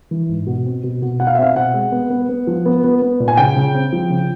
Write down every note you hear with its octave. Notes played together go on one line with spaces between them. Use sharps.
E3
G#2
B2
C4
B2
B2
B2 F#5
F5
E5
C4 F5
B2 F#5
G#3
B3
B3
B3
F3
B3
B3
B3
A#2
G#5
C#3 G5
C#3
C4
F3
C#3